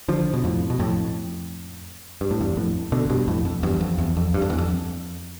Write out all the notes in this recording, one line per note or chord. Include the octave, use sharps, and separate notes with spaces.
D3 F3
B2
F2 A2
B2
F2 A2
G2
A2
E2 G2
F2 A2
B2 D3
G2 B2
F2 A2
F2
E2 G2
F2
E2
F2
G2
F2
E2
F2